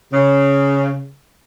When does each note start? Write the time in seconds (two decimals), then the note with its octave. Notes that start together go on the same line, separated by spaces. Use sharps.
0.13 C#3